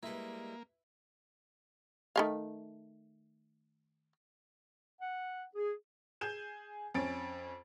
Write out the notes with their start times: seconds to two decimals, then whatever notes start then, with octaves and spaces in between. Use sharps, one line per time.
0.03 G3 G#3 A#3 E4 B4
2.16 D#3 A3 F5
5.00 F#5
5.55 G#4
6.21 G#4 G#5 G6 E7
6.94 F2 C#4 A6 D7